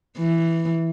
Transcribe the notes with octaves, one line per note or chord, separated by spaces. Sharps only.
E3